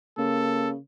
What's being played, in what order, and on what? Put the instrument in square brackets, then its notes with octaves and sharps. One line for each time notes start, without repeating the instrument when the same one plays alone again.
[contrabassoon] C#3 [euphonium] A#3 [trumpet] A4